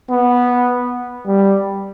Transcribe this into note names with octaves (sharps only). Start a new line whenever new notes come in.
B3
G3